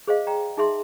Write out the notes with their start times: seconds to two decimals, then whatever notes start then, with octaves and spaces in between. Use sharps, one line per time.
0.08 G#4 C5 D#5 F5
0.27 D5 G5 A#5
0.57 D#4 G#4 E5 C6